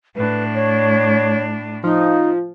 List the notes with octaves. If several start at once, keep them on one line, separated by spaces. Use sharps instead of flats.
A2 D4 B4
C#5
F3 D#4